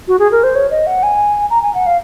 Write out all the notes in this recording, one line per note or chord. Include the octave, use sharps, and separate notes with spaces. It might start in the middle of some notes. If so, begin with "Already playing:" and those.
F#4
G#4
A#4
C5
C#5
D#5
F#5
G#5
A#5
G#5
F#5
F5